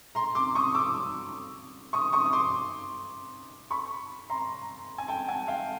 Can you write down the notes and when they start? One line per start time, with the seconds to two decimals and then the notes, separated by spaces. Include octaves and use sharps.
0.15 A#5 C6
0.35 C6 D6
0.55 C#6 D#6
0.74 D6 E6
1.93 C#6 D#6
2.12 C#6 D#6
2.25 D#6
2.33 C6 D6
3.70 B5 C#6
4.30 A#5 C6
4.98 G#5
5.08 G5 A5
5.28 F#5 G#5
5.48 F5 G5